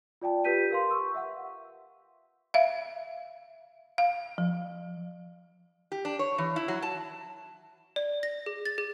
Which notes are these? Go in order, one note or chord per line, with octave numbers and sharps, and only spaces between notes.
F4 D5 G5 A5
F4 G4 B4 G6 B6 D#7
A#4 F5 C6
C#6 E6
E5 F#5
E5 F5
F5
F3
G4
D4
C#5
E3
E4
F#3
A5
D5
A#6
G#4
A6
G#4